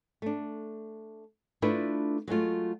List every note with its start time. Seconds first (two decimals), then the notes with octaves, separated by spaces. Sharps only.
0.22 A3 D4
1.62 A3 D4 E4 F4 A4 B4
2.28 F#3 G#3 A3 F4